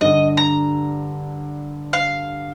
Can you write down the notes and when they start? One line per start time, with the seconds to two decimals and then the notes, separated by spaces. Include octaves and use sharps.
0.01 G2 D3 D#5
0.37 A#5
1.93 F5